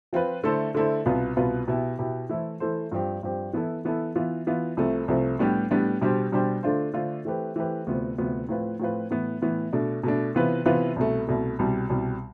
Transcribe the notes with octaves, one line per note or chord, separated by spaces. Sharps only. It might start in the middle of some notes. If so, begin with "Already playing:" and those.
F3 C4 F4 B4
D3 A3 E4 A4 C5
D3 A3 E4 A4 C5
C2 B2 B3 F4 B4
C2 B2 B3 F4 B4
B2 B3 E4 G4
B2 B3 E4 G4
E3 A3 E4 A4 C5
E3 A3 E4 A4 C5
G2 F3 C4 G4
G2 F3 C4 G4
E3 B3 E4 A4
E3 B3 E4 A4
E3 B3 F4
E3 B3 F4
C2 C3 F3 A3
C2 C3 F3 A3
A2 G3 B3 D4 G4
A2 G3 B3 D4 G4
B2 G3 D4 G4 C5
B2 G3 D4 G4 C5
D3 A3 D4 F4 C5
D3 A3 D4 F4 C5
E3 A3 C4 G4 B4
E3 A3 C4 G4 B4
D2 C3 F3 B3
D2 C3 F3 B3
A2 F3 C4 F4 B4
A2 F3 C4 F4 B4
A2 E3 B3
A2 E3 B3
B2 A3 D4
B2 A3 D4
C3 E3 B3 F4 B4
C3 E3 B3 F4 B4
C2 B2 A3
C2 B2 A3
C2 B2 G3
C2 B2 G3